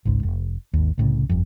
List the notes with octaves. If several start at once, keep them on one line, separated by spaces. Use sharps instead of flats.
G#1 C#2 G#2
F1
G#1 D#2
C2 A2 C#3
G1 F2